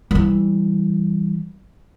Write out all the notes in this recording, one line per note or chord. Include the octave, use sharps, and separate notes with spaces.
E3 G3